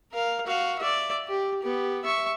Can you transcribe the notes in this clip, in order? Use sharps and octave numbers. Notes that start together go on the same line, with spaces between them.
A#4 F5
F#4 F5
D5 E5
G4
B3 G4
E5 C#6